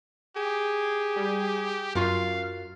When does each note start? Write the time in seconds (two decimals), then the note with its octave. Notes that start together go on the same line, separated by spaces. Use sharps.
0.36 G4 G#4
1.16 G3
1.95 F#2 F4 F#4 A#4 F5